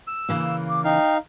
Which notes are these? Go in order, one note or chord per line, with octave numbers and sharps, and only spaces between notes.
E6
C#3 E3 A#3
D6
D#4 F5 G5